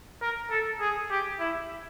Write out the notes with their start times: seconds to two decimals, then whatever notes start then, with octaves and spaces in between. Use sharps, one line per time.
0.22 A#4
0.51 A4
0.80 G#4
1.10 G4
1.40 E4